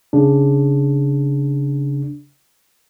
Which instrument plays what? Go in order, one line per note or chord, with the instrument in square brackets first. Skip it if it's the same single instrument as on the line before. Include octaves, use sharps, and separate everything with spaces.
[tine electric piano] C#3 D4